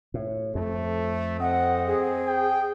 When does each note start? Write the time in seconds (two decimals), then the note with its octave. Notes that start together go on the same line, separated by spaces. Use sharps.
0.14 A2
0.55 F2 A3
1.40 C4 D#5 F#5
1.87 G#4
2.27 G5